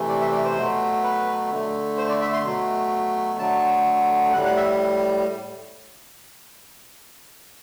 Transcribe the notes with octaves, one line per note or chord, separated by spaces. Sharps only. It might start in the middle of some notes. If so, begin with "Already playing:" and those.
Already playing: C3 E3 A3
D5
E5
D5
C5
B2 F#3 A3
B4
D3 A3
C5
D5
E5
C6
B2 F#3 A3
D3 F#3 A3 A5
A2 G3 F#5
F#5
E5